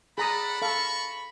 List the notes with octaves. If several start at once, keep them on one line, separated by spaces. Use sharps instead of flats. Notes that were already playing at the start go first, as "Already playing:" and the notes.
G#4 A4 D5 F#5 A#5 B5 D#6
A4 F5 A5 A#5 C#6